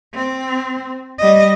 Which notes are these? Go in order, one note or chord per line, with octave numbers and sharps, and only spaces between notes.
C4
G3 D#5